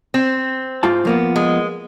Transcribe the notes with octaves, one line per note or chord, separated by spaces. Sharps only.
C4
G#2 F4 A5
F3 A#3 B3
G#3